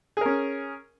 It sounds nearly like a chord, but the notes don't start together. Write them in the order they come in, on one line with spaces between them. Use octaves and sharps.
G#4 A#4 C#4